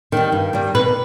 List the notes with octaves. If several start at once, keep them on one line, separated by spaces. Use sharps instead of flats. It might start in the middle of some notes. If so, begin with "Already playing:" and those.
D#3 G3
G2
D#3 G3
B2 B4